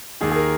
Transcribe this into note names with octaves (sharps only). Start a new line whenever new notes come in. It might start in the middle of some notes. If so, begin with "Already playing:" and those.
D#2 D#3 G#4
G#4
A#4